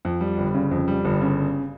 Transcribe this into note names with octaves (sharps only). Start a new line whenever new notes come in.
F2
G3
G1
C#3
F2
G3
G1
C#3